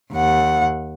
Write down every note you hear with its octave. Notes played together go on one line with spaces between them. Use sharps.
D#2 F#5